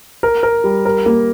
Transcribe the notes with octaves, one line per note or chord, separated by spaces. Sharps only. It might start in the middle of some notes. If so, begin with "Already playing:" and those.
A#4
A#4
G3
A#4
A#3